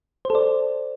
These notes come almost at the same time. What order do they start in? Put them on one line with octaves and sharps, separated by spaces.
C5 A4 D5